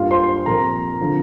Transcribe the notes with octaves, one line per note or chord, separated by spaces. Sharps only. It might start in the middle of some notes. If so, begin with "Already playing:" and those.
Already playing: G2 G3 A#3 F4 F5
C5 C6
A#2 F3 C4 A#4 A#5
D3 F3 C4